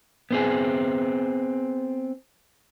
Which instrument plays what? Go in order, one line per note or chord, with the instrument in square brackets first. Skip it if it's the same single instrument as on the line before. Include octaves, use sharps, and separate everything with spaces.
[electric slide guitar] B3 C4 G#4